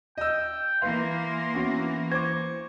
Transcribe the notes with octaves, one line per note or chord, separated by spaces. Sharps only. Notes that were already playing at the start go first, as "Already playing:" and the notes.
D#5 G5 E6
E3 A#3 B4 F5 C6
B3 C#4 F#4
C5 C#6 D6 G#6